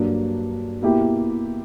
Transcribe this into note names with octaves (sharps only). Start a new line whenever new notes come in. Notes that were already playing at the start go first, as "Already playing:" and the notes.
Already playing: G2 F#3 A#3 D4
B2 A#3 E4 G4